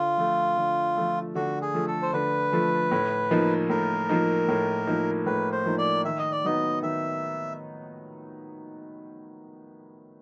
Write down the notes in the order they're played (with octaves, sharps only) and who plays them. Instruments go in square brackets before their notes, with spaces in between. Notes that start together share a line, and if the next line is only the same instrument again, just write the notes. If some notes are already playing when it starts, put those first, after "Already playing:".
Already playing: [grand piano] D3 [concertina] F4
[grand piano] F3 A3
D3
F3 A3
[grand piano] D3 [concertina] F#4
[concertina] G#4
[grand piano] F3 A3
[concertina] A4
C5
[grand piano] D3 [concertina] B4
[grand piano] F3 A3
A2
F3 A#3 D#4
[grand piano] A2 [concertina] A#4
[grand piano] F3 A#3 D#4
A2
F3 A#3 D#4
[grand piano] A2 [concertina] B4
[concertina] C5
[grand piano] F3 A#3 D#4
[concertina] D5
[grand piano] D#3 [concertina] E5
[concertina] D#5
D5
[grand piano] F#3 B3 D#4 [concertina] D#5
[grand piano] D#3 [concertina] E5